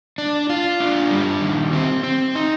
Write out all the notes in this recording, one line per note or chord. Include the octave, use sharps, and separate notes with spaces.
D4
F4
D4
G3
D#3
C4
C4
D#4